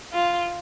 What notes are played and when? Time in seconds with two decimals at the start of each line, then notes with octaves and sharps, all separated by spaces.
0.13 F4